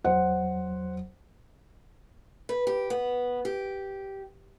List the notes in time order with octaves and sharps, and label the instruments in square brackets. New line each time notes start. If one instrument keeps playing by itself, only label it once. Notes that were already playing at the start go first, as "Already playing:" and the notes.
[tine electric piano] E2 F#3 [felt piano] C5 F#5
[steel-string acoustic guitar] B4
G4
B3
G4